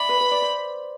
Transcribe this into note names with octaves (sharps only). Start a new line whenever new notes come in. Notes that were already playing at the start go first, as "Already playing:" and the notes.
Already playing: D5 E5 B5
B4
B4
D5
C5